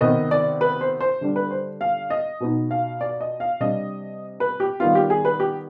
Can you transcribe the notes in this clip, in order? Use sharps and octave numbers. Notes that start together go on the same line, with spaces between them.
C3 D#3 B3 D#5
D5
B4
C5
C5
D3 G3 D4
B4
C5
F5
D#5
B2 B3 D#4
F5
D5
D#5
F5
C3 G3 D4 D#5
B4
G4
D#3 G3 B3 D#4 F4
G4
G#4
B4
G4